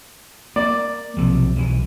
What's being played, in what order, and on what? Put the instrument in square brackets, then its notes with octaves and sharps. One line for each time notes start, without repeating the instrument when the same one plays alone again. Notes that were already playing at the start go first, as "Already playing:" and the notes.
[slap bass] A#3 [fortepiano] D5
[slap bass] B1 C3 F3
B1 E3